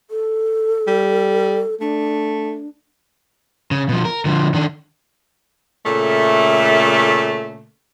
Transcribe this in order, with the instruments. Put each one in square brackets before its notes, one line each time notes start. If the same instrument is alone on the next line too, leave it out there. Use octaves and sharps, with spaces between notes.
[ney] A4
[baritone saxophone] G3
[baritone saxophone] A3 [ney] D4
[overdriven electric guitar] C#3
B2 F3
A#4
D3 F3
D#3 D4
[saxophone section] A#2 C#3 A3